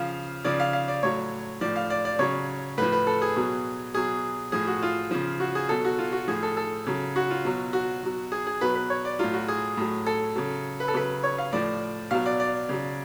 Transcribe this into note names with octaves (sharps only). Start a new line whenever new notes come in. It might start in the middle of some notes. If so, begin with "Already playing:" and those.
Already playing: C#3 F3 F5
C#3 F3 D5
F5
F5
D5
A2 F#3 C#5
A2 F3 D5
F5
D5
D5
C#3 F#3 C#5
A2 F3 B4
B4
A4
G#4
B2 F#3
B2 F#3 G#4
A2 F3 G#4
F#4
F4
C#3 F3
F#4
G#4
B2 F#3 A4
F#4
F4
F#4
A2 F3 G#4
A4
A4
C#3 F#3
F#4
F4
B2 F#3
F#4
B2 F#3
G#4
G#4
B2 F#3 B4
B4
C#5
D5
A2 F#3 F4
F#4
G#4
A2 F#3
A4
C#3 F#3
B4
A4
C#3 F#3 B4
C#5
F5
A2 F3 D5
B2 F#3 F5
D5
D5
C#3 F#3